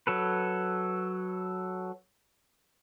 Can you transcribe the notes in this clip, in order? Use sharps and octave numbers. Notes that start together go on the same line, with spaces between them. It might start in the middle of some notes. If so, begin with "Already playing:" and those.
F#3 A4 B4